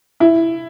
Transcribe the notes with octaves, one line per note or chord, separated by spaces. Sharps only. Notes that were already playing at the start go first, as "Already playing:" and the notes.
E4